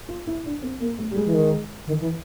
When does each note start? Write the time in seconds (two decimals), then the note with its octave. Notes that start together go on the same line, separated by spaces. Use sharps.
0.09 F4
0.27 E4
0.45 D4
0.62 C4
0.80 A#3
0.99 A3
1.11 G3
1.16 G#3
1.25 E3
1.34 D#3
1.87 D#3
2.01 E3